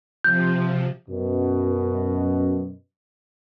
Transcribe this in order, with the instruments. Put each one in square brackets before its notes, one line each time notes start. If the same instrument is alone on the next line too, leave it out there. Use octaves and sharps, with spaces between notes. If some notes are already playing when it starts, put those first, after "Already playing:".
[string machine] C3 F3 [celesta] G6
[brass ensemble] F#2 B2